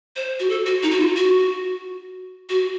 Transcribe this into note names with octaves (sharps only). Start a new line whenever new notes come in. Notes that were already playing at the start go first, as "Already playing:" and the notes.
C5
F#4
A4
F#4
D#4
F#4
F4
F#4
F#4